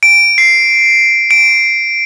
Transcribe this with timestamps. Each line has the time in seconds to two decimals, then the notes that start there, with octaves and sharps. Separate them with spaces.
0.03 D7
0.38 C7
1.31 D7